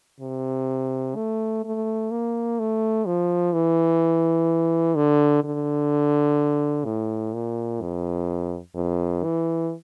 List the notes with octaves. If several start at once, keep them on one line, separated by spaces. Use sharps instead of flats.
C3
A3
A3
A#3
A3
F3
E3
D3
D3
A2
A#2
F2
F2
E3